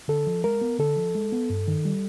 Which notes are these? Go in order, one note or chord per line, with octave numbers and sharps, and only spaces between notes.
D3 A4
F3
G#3 A#4
B3
D3 A4
F3
G#3
B3
G2
D#3
G3